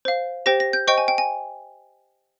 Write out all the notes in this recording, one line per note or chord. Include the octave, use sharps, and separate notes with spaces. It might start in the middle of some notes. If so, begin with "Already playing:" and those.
C5 F5
G4 C5 G5 A#6
A#6
G6
C5 D#5 G5 C#6
G#5
G5
G#5